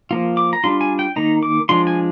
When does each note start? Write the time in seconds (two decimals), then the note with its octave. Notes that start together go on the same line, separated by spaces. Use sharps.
0.11 F3 A#3 F4
0.37 D6
0.53 A#5
0.64 G3 D4 F4 C6
0.81 G#5
0.99 G5
1.16 D#3 A#3 D#4 A#5
1.43 D6
1.69 F3 G#3 D4 F4 C6
1.87 G#5